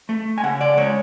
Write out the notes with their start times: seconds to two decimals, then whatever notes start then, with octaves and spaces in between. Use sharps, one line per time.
0.09 A3
0.38 G#5
0.43 C#3 F#5
0.61 D5
0.77 G#3 C#5